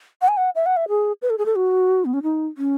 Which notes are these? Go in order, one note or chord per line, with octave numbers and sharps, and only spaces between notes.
F#5
G#5
F#5
E5
F#5
E5
G#4
B4
A4
G#4
A4
F#4
B3
C#4
D#4
C#4